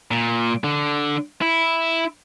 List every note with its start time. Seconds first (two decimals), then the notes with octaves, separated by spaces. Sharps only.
0.11 A#2
0.64 D3
1.42 E4